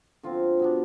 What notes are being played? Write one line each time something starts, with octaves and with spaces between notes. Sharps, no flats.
D3 F3 C4 F4
B2 B3 D4